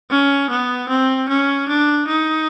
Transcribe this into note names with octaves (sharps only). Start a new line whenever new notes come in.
C#4
B3
C4
C#4
D4
D#4